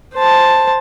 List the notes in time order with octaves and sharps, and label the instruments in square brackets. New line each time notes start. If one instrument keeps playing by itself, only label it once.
[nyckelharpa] C5 A5